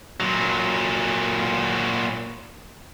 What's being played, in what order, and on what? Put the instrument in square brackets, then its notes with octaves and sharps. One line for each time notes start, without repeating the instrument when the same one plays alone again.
[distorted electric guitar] A#2 F#3